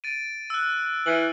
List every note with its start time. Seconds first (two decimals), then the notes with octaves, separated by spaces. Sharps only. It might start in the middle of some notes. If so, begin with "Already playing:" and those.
0.04 A6 D7 D#7
0.50 E6 F#6
1.06 E3 F6 F#7